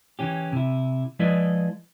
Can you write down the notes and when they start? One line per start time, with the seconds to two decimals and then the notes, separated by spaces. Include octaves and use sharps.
0.19 C#3 E3 C#4 G4
0.52 C3 E4
1.19 F3 G#3 E4 B4 D5 D#5